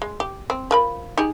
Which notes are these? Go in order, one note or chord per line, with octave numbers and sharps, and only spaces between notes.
G#3
G4
C4
F3 A#4 B5
D#4 G4 G#4